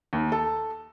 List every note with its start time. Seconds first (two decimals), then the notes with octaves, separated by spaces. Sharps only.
0.13 D#2
0.32 A4